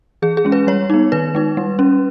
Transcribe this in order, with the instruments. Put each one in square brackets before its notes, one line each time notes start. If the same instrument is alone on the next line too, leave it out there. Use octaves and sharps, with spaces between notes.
[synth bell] E3 G#4
G#4
G#3 C#4
B4
G3 C#5
B3 D#4
D#3 B4
G#3 D#4
G3
C#4